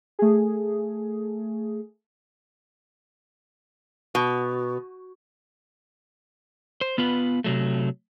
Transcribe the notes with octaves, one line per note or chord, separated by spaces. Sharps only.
A3 G#4
B2
C5
B3 F4 B4
C3 F#3 A3